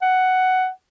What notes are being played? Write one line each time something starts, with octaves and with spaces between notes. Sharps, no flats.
F#5